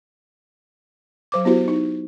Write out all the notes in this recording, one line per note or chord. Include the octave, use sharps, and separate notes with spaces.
F#3 C5 D6
B3 E4 F#4 G4 C5
D#4